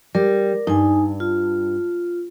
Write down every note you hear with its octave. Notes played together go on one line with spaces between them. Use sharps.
G3 A#4
G2 D#4 G#5
F4